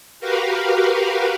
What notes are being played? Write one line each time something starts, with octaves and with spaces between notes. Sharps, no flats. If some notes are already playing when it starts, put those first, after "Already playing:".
F#4 G4 A#4 B4 F5